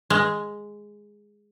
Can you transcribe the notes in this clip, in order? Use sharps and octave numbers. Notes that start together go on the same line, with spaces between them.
G#3